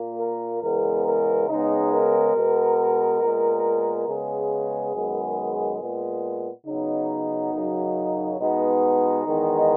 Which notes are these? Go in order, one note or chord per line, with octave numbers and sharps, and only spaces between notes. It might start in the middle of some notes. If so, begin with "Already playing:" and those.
Already playing: A#2 A#3
A#4
E2 C#3 G#3 B3 A#4
A#4
C#3 G#3 B3 D#4
A#4
B2 G#3 B3
A#2 G#3 B3
C#3 G#3 B3 G#4
F#2 D#3 G#3 B3
A#2 G#3 B3
C#3 F#3 B3 D#4
F#2 C#3 F#3
B2 G#3 B3 D#4
E2 D#3 G#3 B3